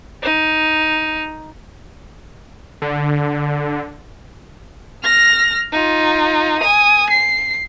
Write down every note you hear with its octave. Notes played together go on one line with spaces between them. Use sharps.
D#4
D3
F6 A#6
D#4 F4
G#5 D#6
C7